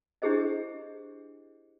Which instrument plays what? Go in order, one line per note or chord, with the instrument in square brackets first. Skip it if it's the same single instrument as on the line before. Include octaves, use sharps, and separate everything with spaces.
[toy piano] D4 E4 G4 G#4 C5 D#5